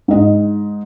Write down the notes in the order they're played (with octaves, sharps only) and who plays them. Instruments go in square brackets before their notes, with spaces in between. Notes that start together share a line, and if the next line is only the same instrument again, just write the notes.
[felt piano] G#2 D#5